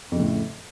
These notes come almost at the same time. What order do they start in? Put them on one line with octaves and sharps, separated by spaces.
F2 C#3 A2